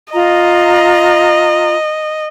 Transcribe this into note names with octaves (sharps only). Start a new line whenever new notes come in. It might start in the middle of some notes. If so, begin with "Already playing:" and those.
F4 D#5 A#5